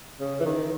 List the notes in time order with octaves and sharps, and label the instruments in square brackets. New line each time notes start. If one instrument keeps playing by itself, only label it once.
[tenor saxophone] C#3
E3
D#3